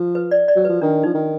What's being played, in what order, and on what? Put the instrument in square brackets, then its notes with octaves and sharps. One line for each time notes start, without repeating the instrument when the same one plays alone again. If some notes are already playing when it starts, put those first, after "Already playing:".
Already playing: [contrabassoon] F3
[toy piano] B4
D5
D5
[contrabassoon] F#3
[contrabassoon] F3 [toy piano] B4
[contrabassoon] D#3 [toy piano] D4
[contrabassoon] F3 [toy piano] D#4
[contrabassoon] D#3